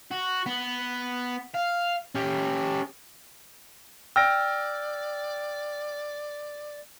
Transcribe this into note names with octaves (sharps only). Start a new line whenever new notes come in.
F#4
B3
F5
C#4 G4
D5 G5 E6 F6 A#6 D7